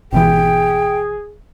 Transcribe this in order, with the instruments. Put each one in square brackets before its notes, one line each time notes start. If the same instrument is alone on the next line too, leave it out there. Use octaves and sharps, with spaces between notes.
[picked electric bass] G#1 B2 E3 [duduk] G#4 [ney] G5